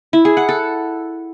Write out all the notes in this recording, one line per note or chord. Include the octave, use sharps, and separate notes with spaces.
E4
G#4
F#5
A4